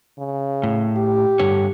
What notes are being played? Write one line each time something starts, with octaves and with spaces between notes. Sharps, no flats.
C#3
A2
G4
G2 D3 C#5